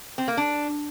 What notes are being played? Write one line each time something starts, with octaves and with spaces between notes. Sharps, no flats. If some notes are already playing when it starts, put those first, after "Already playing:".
C4
A#3
D4